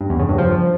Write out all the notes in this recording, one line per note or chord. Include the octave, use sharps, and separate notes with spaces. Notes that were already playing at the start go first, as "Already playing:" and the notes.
G2
E2
C#3
G2
F3